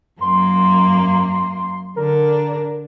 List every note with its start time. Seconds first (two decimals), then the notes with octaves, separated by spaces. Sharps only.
0.21 F#2 A#3 C6
1.96 D3 D4 A#4